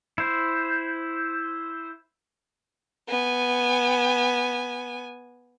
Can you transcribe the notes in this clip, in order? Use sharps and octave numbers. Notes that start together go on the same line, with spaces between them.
E4 C5
B3 G#5